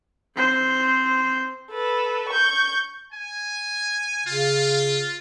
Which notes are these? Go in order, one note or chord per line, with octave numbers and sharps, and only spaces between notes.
C4 C5
A4 B4
C#6 G6
G#5
C#3 F4